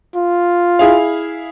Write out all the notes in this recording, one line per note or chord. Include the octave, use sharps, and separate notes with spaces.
F4
E4 G#4 F5